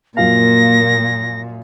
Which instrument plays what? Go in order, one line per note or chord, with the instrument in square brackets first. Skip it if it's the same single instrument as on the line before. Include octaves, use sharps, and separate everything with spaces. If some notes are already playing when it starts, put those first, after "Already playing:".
[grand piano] F#2 F3 F5 [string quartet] A#2 [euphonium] A#3 [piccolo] A#6